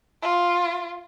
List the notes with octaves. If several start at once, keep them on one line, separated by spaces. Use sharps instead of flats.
F4